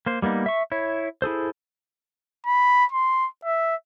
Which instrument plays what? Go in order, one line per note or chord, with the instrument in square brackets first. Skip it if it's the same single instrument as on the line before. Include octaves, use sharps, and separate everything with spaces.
[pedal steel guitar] A#3 C5
G3 A#3 B3 D#4
E5 C#6
E4 C#5
E4 G#4 A4 C5
[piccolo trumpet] B5
C6
E5